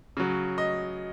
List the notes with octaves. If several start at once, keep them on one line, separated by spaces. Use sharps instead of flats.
C#3 F#3
D#5